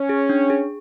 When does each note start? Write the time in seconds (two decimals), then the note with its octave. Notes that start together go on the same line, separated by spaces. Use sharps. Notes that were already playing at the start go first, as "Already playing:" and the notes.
Already playing: C#4
0.09 G#4
0.30 D4
0.50 G#4